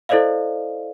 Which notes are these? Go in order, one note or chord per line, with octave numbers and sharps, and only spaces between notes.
E4 A4 C5 D5 D#5 F5